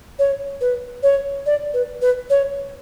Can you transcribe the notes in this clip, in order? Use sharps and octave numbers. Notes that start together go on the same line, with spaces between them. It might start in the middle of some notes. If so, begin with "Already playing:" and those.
C#5
B4
C#5
D5
B4
B4
C#5